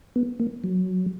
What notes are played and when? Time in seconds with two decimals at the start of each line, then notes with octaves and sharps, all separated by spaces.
0.16 B3
0.40 A#3
0.64 F#3